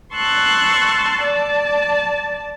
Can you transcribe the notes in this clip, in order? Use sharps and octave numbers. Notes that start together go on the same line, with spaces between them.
A5 C6 C#6 E6 F#6
D5 A5